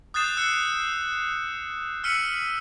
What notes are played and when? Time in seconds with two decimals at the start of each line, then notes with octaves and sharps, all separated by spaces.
0.14 D#6 F#6 G6 A6 C7 E7
0.37 E6 F#6 A6 C#7
2.04 E6 F6 B6 C#7 D#7 F#7